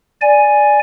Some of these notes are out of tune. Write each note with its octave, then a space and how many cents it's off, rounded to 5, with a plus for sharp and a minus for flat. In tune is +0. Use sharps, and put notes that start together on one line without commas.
D5 +0 G#5 +0